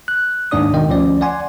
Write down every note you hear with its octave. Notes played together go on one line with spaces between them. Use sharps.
F#6
D#2 G#2 D4 D5 D#6
B2 D#3 D#5 G5
D2 F3 C#4 D5
D5 F#5 G#5 C6